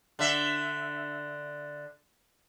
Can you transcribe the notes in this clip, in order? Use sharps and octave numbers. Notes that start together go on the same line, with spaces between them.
D3 E5